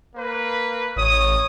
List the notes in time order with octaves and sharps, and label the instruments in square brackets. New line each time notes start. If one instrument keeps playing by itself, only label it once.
[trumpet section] A#3 B4
[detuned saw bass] A1 [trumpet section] C#5 D#6